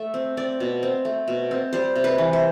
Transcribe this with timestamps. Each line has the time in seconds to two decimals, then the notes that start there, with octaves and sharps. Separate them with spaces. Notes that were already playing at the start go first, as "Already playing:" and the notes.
Already playing: A3 E5
0.14 C4
0.37 C4 D5
0.60 B2
0.83 C4
1.05 A3
1.28 B2
1.51 C4
1.73 G3 C5
1.96 C3
2.04 B4
2.18 E3
2.33 C5